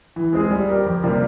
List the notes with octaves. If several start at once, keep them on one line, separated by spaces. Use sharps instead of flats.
E3
G#3 C4 F4 G#4
G3
C4 G4 A#4
F2
C3 G3 A#3 F4